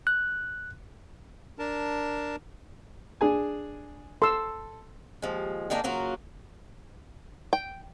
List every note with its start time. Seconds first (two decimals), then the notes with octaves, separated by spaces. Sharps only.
0.07 F#6
1.59 D4 A#4 A5
3.21 D4 G#4 G#5
4.22 A4 C6 E6
5.22 D#2 F3 G#3
5.70 D#3 G#3 A#3 D4 D#4
5.84 C#3 F#3 A#3 F4 F#4
7.53 G5